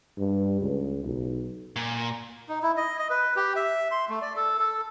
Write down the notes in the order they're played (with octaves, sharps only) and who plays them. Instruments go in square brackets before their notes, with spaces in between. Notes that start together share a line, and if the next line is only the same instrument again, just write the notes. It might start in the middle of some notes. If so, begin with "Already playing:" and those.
[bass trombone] G2
C#2
B1
[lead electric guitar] A#2
[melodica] D#4
E4
D#5
D#5
B4
G4
E5
C6
A3
D5
A4
A4